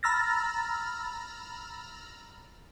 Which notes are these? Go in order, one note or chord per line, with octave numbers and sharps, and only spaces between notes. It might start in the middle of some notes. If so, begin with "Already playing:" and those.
A#5 B5 E6 F6 A6 A#6